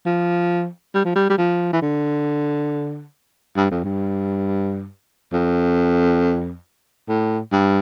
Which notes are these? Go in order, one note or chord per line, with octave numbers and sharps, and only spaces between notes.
F3
G3
F3
G3
G3
F3
E3
D3
G2
F2
G2
F2
A2
G2